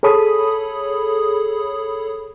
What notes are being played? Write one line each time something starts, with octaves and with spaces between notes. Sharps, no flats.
G#4 A4 C#5 B5 D#6